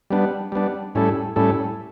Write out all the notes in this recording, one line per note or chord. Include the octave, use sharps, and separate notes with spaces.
G3 B3 D4
G3 B3 D4
A2 G3 C#4 E4 A4
A2 G3 C#4 E4 A4